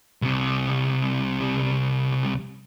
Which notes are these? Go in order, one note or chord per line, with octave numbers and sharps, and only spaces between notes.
C2 C3